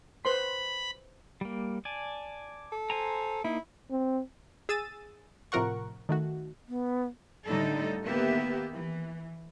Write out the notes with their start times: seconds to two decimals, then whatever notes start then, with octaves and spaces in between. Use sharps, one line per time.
0.25 B4 C5 B5 C6
1.41 G3 A#3
1.85 D5 G#5 A5
2.72 A4
2.90 C5 G#5 A#5
3.44 A#3 D#4 E4
3.91 C4
4.69 G#4 E6 A6 D#7
5.52 A2 C3 F3 A#4 F#5 C#6
6.09 D#3 A3 F#4
6.68 B3
7.45 A2 D3 G3 D#4 A4
8.05 D#3 A#3 B3 G4 E5
8.73 E3